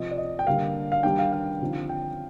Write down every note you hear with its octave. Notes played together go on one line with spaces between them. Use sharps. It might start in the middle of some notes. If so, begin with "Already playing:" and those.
Already playing: C3 F3 C4 D#5
D5
D#5
G5
D3 G3 A#3 F5
F5
D#3 G3 D4 G5
F5
F5
D3 F3 C4 D#4
G5